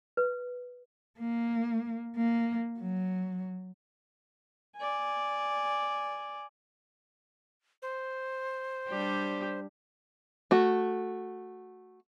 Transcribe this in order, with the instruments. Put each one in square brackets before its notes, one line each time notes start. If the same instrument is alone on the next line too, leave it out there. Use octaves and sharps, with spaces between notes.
[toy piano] B4
[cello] A#3
A#3
F#3
[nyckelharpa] D5 G#5
[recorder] C5
[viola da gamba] G3 D4 G4
[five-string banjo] A3 F#4